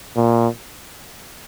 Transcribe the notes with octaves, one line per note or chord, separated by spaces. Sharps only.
A#2